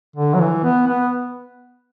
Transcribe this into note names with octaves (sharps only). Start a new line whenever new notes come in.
D3
F#3
E3
B3
B3